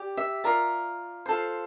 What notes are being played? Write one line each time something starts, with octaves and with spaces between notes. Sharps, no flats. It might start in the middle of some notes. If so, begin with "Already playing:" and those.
Already playing: G4 D5
E5
F4 A#4 D5
F4 A4 C5